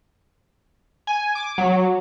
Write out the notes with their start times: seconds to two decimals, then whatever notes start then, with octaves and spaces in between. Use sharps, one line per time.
1.07 G#5
1.35 D6
1.58 F#3